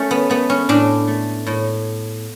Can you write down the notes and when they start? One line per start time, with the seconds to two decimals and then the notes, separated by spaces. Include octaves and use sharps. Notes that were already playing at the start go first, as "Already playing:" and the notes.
Already playing: A3 C#4
0.11 B3
0.30 A3 B3
0.50 C#4
0.69 A2 D4
1.07 A3
1.47 A2